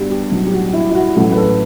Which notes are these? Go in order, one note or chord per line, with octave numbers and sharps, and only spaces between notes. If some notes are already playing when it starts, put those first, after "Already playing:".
Already playing: G2 D3 G3 B3 F#4 G4
G4
B1 A2 F#3
G4
F#4
E4
E4
F#4
A1 A2 F#3 A3 F#4
B4
A4